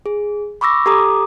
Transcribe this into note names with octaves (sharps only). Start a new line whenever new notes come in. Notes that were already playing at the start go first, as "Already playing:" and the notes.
G#4
B5 C#6 D6 E6 A#6
G4 A4 A#5 D6 D#6